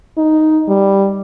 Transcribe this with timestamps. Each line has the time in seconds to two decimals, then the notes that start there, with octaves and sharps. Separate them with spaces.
0.17 D#4
0.68 G3